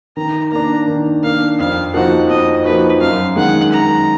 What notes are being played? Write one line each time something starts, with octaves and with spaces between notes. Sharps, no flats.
D#3 A#5
A#3 D4 A#5
D#3
A#3 D4 F5
F2 F5
F3 A#3 D#4 F#4 F#5
F2 D#5
F3 A#3 D#4 F#4 B4
F#2 F5
D#3 G#3 F#5
F#2 A#5